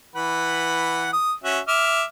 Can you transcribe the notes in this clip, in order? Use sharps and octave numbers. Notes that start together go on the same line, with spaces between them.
E3 B4 F#5
D#6
C#4 F#4 E5
E5 D6 F6